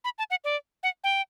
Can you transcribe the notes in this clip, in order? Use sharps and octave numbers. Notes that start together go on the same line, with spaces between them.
B5
A5
F#5
D5
F#5
G5